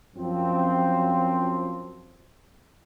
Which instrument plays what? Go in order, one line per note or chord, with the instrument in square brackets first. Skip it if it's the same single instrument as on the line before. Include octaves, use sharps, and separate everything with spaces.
[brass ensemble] F#2 F3 C4